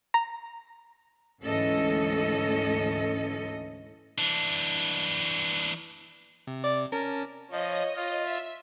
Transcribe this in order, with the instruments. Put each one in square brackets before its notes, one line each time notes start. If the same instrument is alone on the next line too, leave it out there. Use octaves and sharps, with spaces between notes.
[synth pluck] A#5
[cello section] D2 G#2 E3 C#4 A4 D#5
[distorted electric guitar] E3 D4
[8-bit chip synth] C3
[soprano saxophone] D5
[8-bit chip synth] C#4 A5 [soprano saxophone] A#4
[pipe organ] F3 [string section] C#5 D#5
[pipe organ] F4
[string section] E5